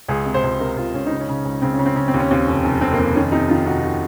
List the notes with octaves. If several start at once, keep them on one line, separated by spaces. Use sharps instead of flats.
C#2 G#4
C3
C5
C#2
C3 A#4
C#2 F4
C#2 C#4
C#3 D#4
C#4
C#3
C#2
C#3 C4
C#4
C#3
C4
C#3 C#4
C4
D#2
C#4
D#2 C4
F1
F1
F1 C4
A#3
F1 C4
D#3 C#4
C3 D#4
D#3 F4
C3 F#4
C3 F#4